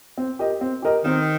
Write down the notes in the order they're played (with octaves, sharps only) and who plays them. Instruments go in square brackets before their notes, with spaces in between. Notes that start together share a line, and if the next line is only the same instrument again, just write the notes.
[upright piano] C4
G4 A#4 D#5
C4
G4 A#4 D#5
[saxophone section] D#3 [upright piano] C4